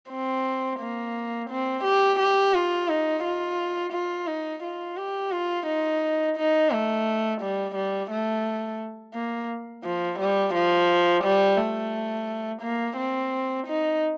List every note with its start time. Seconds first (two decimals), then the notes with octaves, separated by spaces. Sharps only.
0.11 C4
0.80 A#3
1.50 C4
1.84 G4
2.20 G4
2.54 F4
2.88 D#4
3.24 F4
3.93 F4
4.27 D#4
4.63 F4
4.97 G4
5.32 F4
5.66 D#4
6.37 D#4
6.71 A3
7.41 G3
7.75 G3
8.11 A3
9.14 A#3
9.84 F3
10.19 G3
10.54 F3
11.24 G3
11.57 A3
12.62 A#3
12.97 C4
13.67 D#4